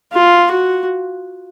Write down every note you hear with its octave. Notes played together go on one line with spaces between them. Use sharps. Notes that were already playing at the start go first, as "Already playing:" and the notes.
F4
F#4